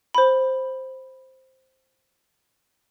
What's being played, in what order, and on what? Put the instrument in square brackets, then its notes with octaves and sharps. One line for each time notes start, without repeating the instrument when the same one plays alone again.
[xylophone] C5 B5